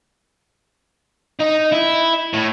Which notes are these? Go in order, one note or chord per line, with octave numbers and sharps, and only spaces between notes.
D#4
E4
A2